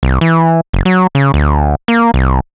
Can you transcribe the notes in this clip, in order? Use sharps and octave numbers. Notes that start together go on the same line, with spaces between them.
C2
E3
F#1
F#3
C#3
D2
A#3
C2